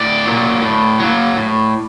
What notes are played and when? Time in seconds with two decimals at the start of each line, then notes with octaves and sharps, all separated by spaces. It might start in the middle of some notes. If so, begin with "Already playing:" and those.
Already playing: A2 D5
0.26 F#3 A#3
0.62 A2
1.00 F#3 A#3
1.36 A2